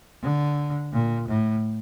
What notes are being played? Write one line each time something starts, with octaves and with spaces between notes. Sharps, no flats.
D3
A#2
A2